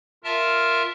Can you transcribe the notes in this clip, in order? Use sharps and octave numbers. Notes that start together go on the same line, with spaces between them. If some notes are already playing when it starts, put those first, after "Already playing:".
F4 A#4 E5 A5 F6